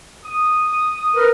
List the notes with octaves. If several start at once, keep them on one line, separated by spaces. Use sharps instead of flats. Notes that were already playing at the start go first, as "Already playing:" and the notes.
D#6
A#4 B4 F6